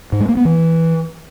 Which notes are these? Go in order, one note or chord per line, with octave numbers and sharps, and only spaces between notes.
G#2
G#3
A#3
B3
E3